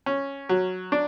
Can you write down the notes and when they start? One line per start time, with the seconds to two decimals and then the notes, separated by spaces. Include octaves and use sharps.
0.06 C#4
0.49 F#3
0.92 D4